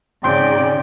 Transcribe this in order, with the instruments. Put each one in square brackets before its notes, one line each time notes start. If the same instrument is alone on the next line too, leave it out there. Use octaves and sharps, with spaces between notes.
[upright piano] G#1 C6 [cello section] C#3 [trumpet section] D5 [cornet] G5